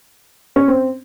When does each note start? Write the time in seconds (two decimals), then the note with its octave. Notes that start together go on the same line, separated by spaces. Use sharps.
0.56 C#4
0.68 C4